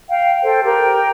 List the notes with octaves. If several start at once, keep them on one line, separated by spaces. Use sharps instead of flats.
F5 G5
A4 C5 G5
G4 A#4 G5